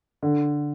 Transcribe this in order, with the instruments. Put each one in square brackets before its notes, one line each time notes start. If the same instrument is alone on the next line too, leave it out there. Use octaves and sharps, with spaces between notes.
[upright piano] D3